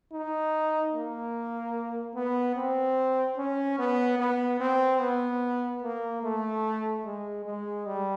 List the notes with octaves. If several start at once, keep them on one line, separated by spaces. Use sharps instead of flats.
D#4
A#3
B3
C4
C#4
B3
B3
C4
B3
A#3
A3
G#3
G#3
G3